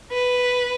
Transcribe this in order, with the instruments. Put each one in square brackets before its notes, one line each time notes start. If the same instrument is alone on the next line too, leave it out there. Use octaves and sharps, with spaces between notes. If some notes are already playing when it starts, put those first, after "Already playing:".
[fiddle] B4